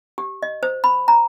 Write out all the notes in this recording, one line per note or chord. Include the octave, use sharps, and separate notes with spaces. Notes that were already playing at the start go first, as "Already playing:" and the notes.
G4
D#5
C5
B5
A#5